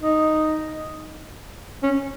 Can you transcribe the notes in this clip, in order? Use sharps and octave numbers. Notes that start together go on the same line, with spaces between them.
D#4
C#4